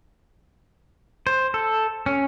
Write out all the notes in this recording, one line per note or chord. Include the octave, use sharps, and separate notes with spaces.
C5
A4
C#4